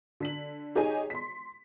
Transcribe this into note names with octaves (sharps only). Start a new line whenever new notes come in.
D3 B6 F#7
D#4 G4 G#4 C#5 D#5 G#5
C6 B6